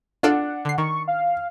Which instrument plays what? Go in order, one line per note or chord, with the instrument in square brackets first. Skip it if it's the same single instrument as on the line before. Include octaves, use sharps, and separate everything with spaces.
[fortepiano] D4 [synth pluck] F4 A4 D5 [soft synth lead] F#5
[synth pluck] D3 C7
[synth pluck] D#3 [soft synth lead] C#6
[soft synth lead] F5